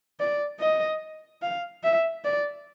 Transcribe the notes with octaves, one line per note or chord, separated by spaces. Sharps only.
D5
D#5
F5
E5
D5